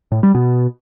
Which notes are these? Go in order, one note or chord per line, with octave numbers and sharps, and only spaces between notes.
A2
G3
B2